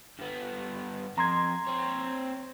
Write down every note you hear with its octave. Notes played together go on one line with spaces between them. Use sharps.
G2 B3
F2 A#5 C6 G#6
C4 C#5